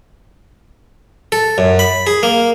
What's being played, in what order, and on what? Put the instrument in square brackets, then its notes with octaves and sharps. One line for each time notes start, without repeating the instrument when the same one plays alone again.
[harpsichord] A4
F#2
B5
G#4
A#3